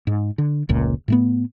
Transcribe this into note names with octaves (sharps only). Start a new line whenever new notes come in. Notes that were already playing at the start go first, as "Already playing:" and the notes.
G#2
D3
F1 C#2 A#2
A2 A3 B3